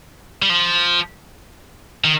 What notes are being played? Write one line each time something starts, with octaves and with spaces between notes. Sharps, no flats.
G3
F3
D#3